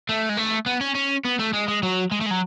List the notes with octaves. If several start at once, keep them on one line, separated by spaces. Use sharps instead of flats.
A3
G#3
A3
B3
C#4
C#4
B3
A3
G#3
G#3
F#3
G#3
A3
G#3
F#3